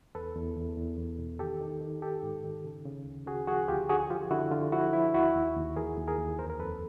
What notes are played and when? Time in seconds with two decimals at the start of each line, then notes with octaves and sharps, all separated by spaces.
0.15 E2 A4 B4
0.35 E2
0.56 E2
0.77 E2
0.98 E2
1.19 B2
1.39 D#3 G4 A4
1.61 D#3
1.81 D#3
2.02 D#3 G4 A4
2.23 G#2
2.44 D#3
2.64 C#3
2.85 C#3
3.06 D2
3.27 C#3 F#4 G#4
3.47 F3 F#4 G#4
3.68 D2 F4 G4
3.89 D3 F#4 G#4
4.10 F3 F4 G4
4.31 D3 E4 F#4
4.52 D3 F4
4.72 F3 E4 F#4
4.93 F3 E4
5.14 D#2 E4 F#4
5.35 D#2
5.56 D#2
5.76 E3 G#4 A#4
5.98 D#2
6.08 G#4 A#4
6.18 D#2
6.39 F2 A#4 C5
6.50 A#4
6.59 F2 A4 B4